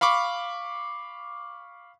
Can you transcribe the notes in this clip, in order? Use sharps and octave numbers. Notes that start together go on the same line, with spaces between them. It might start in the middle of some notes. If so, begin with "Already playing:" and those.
F5 B5 C#6 D6